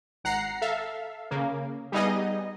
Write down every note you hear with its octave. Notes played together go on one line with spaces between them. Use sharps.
G#1 F#5 A#5 C7
A4 E5 F5
C#3 A#3
G3 B3 D#4 G#4 D#5